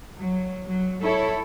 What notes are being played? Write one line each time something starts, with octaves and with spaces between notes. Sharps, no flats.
F#3
F#3
E4 A4 C#5